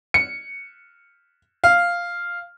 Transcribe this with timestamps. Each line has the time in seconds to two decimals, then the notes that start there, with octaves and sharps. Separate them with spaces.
0.14 C#7
1.64 F5